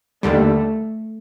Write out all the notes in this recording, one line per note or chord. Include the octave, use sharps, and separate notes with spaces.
D#2 D3 G3 A3